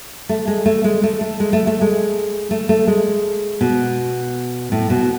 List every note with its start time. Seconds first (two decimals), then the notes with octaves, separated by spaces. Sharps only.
0.29 A3
0.47 G#3
0.66 A3
0.84 G#3
1.03 A3
1.21 A3
1.40 G#3
1.53 A3
1.67 A3
1.81 G#3
2.51 A3
2.69 A3
2.87 G#3
3.61 B2
4.72 A2
4.90 B2